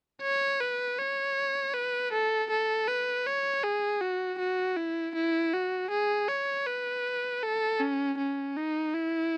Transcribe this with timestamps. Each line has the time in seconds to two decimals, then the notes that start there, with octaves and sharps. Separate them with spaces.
0.22 C#5
0.60 B4
0.99 C#5
1.74 B4
2.12 A4
2.50 A4
2.87 B4
3.26 C#5
3.64 G#4
4.01 F#4
4.39 F#4
4.77 E4
5.15 E4
5.54 F#4
5.90 G#4
6.28 C#5
6.67 B4
7.43 A4
7.80 C#4
8.18 C#4
8.57 D#4
8.94 E4